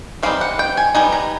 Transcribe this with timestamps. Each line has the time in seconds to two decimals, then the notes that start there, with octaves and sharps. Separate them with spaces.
0.23 E3 G3 C4 D#4 F5
0.41 F#5
0.59 G5
0.77 G#5
0.95 G3 B3 D#4 G#5
1.13 A#5